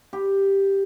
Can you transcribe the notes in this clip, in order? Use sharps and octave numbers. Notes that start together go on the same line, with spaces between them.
G4